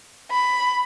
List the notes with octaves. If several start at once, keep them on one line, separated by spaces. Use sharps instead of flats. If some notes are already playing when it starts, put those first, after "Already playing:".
B5